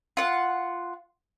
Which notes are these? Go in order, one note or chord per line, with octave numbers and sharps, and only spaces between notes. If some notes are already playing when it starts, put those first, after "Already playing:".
F4 F#5